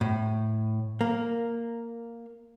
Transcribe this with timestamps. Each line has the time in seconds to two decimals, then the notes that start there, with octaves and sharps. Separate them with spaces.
0.01 A2
1.01 A#3